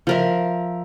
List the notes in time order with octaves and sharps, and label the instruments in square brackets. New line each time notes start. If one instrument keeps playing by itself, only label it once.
[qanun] F3 A#4 E5